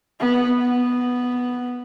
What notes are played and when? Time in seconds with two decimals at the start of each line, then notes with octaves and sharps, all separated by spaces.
0.20 B3
0.60 B3